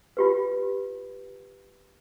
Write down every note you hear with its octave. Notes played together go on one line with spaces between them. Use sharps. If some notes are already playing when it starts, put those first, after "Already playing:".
F4 G4 B4